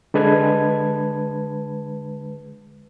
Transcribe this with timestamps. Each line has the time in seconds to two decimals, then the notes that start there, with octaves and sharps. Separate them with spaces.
0.14 D3 G#3 B4 A5 G#6